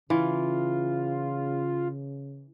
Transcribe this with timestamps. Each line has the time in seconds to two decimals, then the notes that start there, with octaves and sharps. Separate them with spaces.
0.10 C#3 E3 F4